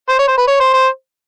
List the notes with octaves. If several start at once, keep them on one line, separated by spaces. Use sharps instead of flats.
C5
C#5
C5
B4
C#5
C5
C5